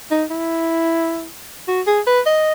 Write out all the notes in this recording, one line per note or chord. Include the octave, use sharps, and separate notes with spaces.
D#4
E4
F#4
G#4
B4
D#5